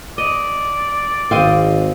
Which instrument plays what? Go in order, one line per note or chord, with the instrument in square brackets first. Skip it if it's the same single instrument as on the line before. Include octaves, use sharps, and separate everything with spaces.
[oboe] D5 [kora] D#5
[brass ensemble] G#1 [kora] C4 C5 D#5 [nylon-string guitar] F5